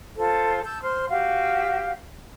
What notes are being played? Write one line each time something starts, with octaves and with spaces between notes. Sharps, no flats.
F4 A4 C5
A5 E6 G6
C5 C6 F6
F#4 G4 F5